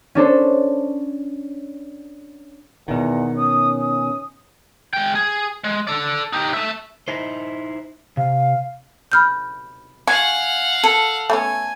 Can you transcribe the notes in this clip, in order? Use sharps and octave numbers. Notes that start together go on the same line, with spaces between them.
C#4 D4 A4 C5
E2 B2 D#3 F#5
C#4 D#6
D#6
G#3 G5
G#4
G#3
A4 D5
D#4 G4
A3 E5
D#4 E4 C5
C3 F5
B5 F6 G6
F#4 F5 F#5 G#5
A4
A3 B3 C#4 G#5